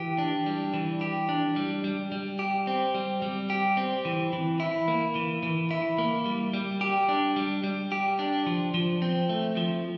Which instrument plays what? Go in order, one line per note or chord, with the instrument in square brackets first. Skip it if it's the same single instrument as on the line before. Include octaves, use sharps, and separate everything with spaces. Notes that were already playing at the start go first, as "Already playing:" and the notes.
Already playing: [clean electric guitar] E3 G4
D4
G3
E3
G4
D4
G3
G3
G3
G4
C4
G3
G3
G4
C4
E3
E3
E4
A#3
E3
E3
E4
A#3
G3
G3
G4
D4
G3
G3
G4
D4
F3
F3
C4
A3
F3